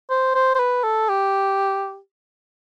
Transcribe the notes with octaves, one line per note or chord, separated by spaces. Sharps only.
C5
C5
C5
B4
A4
G4